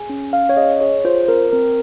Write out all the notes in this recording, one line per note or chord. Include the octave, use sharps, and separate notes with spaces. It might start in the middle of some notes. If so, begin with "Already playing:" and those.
Already playing: G#4 G#5
C#4
C#4 F5
C#5
G#4 D#5
G#4 C#5
F4 C5
C4 A#4
C4 A#4